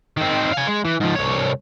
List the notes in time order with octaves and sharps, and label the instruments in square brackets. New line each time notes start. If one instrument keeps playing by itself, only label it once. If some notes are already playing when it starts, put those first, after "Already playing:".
[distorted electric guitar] D#3 C4
F5 G#5
G#3
E3
G#2 F3
C2 C#5